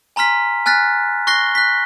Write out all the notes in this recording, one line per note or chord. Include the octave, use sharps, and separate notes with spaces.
G#5 A#5 C6 F6 B6
G#5 F6 F#6 A6 B6
C#6 F#6 A#6 C7 G7
F#6 B6